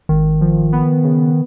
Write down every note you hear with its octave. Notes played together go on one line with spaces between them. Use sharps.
G#1 D#3
F3
B3
C#3